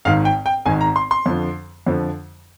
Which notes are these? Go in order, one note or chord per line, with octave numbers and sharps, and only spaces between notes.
G#1 G#2 D#3 F5
G5
G5
G#1 G#2 D#3 G#5
A#5
C6
C6
F2 D3 F3
F2 D3 F3